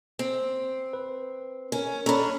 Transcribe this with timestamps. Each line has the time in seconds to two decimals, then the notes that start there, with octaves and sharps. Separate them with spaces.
0.19 C4
0.93 B4
1.72 C#4 A#4
2.06 C#4 D4 A4 A#5 B5